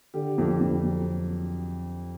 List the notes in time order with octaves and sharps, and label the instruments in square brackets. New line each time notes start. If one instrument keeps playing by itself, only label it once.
[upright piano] D3 G4
F2
F2
F#3